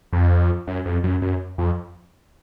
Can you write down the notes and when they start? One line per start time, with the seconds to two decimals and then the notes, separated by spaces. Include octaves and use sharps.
0.13 F2
0.67 F#2
0.86 F2
1.04 F#2
1.22 F#2
1.58 F2